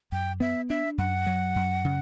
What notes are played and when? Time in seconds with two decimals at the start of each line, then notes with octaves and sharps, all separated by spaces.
0.12 F#2 G5
0.40 B3 E5
0.69 D4 E5
0.98 F#2 F#5
1.27 F#3
1.56 F#2
1.85 C#3